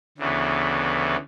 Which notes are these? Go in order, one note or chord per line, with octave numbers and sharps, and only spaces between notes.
D2 C#3 E3 B3